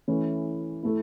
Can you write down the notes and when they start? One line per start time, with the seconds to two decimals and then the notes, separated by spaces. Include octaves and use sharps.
0.08 E3 A3 C#4 E4
0.83 A3 E4